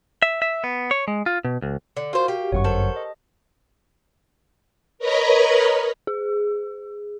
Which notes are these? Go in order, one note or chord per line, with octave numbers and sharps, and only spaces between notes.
E5
E5
B3
C#5
G#3
F4
B2
C#2
D3
F4 F#4 A#4 C5 F5
G4
G1 F#2 C#5 F#5 C#6
A4 A#4 C5 C#6
D#5
A#4 B4 C#5 D#5 A#5 B5
G#4